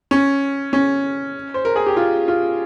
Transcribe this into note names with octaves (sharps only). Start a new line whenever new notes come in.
C#4
C#4
C5
A#4
G#4
G4
F4
F4